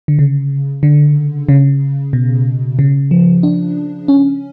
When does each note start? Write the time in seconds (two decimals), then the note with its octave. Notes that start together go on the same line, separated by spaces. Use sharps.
0.08 D3
0.19 C#3
0.83 D3
1.49 C#3
2.13 B2
2.79 C#3
3.11 F3
3.43 D4
4.08 C#4